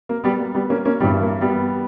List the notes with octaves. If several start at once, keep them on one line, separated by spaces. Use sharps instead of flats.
A#3
G3 B3
A#3
G3 B3
A#3 C#4
A#3 C#4
G2 E3 G3 B3
A#3
G3 B3